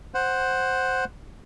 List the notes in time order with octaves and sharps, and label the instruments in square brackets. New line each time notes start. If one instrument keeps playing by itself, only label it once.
[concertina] C5 F#5